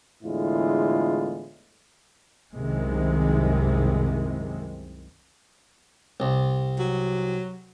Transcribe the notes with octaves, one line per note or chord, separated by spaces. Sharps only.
E2 A2 D3 G#3 E4 F4
C2 F#2 C3 D#3 G#3
C2
F#3